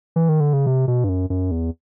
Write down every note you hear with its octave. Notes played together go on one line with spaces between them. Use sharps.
E3
D#3
D3
C#3
C3
B2
G2
F#2
F#2
E2